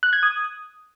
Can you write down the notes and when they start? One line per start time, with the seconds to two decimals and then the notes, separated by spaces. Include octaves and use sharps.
0.03 F#6
0.13 G#6
0.23 D#6